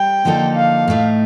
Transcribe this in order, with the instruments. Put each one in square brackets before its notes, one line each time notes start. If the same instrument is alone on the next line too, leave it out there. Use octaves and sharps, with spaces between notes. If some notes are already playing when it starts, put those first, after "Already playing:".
Already playing: [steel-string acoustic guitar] G3 [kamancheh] G5
[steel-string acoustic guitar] D3 F3 A#3 D#4 A4
[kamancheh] F5
[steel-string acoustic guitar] A2 A3 D#4